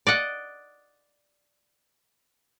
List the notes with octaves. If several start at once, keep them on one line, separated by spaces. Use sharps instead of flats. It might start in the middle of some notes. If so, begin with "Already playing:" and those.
D5 D#5 F#5